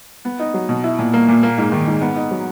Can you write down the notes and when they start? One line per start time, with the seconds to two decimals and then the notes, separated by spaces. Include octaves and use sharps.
0.25 B3
0.39 D#4
0.54 F#3
0.69 B2
0.84 E4
0.99 A#2
1.13 A#3
1.28 A#2
1.43 A#3
1.58 G#2
1.72 D#3
1.87 G#2
2.02 B3
2.16 D#4
2.31 F#3